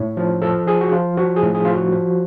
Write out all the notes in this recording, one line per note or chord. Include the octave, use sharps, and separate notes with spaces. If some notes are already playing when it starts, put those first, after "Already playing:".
Already playing: A2 C#5
F3
F3 A4
F3 G#4
F#4
F3 F4
F3 F#4
G#4
A2
G#4
F3 F4
F#4
F3